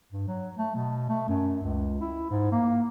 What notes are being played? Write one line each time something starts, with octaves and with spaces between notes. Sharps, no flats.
G2
F#3
A3
B2
A3
F#2
C#2
E4
G#2
A#3